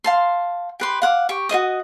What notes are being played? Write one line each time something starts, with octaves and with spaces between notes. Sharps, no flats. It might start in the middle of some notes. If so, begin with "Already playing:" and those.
F5 A5 C6
G4 B4 C6
F5 F#5 D6
G4 C#6
F#4 C5 D#5 D#6